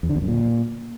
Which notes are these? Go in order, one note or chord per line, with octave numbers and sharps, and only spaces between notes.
E2
D3
E2
F#2
A#2